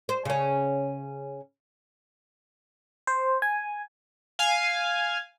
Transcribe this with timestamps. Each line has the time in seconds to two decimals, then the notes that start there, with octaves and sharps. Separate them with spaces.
0.09 C5
0.25 C#3 C#4
3.07 C5
3.42 G#5
4.39 F5 G#5